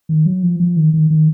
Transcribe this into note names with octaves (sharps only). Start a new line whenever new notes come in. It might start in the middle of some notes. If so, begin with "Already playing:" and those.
D#3
F#3
F3
F3
D#3
D#3
D#3